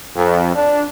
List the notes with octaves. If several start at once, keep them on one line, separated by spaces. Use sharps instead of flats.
F2
D4